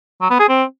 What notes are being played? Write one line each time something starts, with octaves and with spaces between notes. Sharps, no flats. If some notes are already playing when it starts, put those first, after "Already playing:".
F#3
B3
G#4
C4